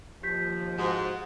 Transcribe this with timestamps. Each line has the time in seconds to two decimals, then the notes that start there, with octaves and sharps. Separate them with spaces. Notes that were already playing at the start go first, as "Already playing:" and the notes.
0.23 D#2 F3 G4 G6 B6
0.78 G#2 F#4